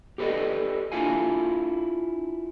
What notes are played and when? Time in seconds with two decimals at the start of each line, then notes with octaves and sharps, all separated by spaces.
0.18 G4 A4 B4 D5 D#5
0.92 D4 E4 F4 A#4 F5 G#5